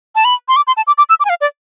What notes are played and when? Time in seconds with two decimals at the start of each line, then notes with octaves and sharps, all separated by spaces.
0.15 A5
0.25 B5
0.48 C6
0.56 D6
0.67 C6
0.77 A5
0.87 D6
0.98 D6
1.09 E6
1.20 D6
1.25 G#5
1.29 F5
1.41 D5